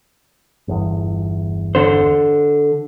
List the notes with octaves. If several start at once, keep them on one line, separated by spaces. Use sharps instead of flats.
G1 E2
D3 C5